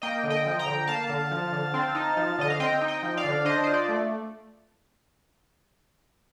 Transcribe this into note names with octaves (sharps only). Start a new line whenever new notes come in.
A#3 D#5 G5
D3
D#5 G5
F3
G5 A#5
D3
A#3 F5 A5
D3
F3
D3
C4
D#4
F3
D3 D#5
F5
C4 D#5 G5
D#4
D#5 G5
F3
D5 F5
D3
D4 C5 D#5
F4 C5
D5
A3